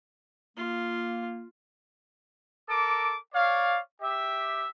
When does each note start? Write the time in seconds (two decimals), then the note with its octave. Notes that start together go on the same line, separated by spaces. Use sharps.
0.57 A#3 F4
2.69 A4 A#4 D6
3.34 C#5 D5 F5
4.02 G4 E5